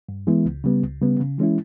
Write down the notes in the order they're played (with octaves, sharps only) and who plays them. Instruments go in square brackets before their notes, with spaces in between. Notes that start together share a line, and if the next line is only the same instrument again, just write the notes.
[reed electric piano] G2
E3 G#3 B3 E4
C#2
C#3 G3 B3
C#2
C#3 G3 B3
C#3
E3 G#3 C#4 E4